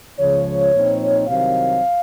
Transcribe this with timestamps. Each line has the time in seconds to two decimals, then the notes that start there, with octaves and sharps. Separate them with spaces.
0.18 C#2 C#3 F3 C#5
0.73 A#2 F3 C4 D#4
1.27 C2 C3 D#3 F#3 C4 F5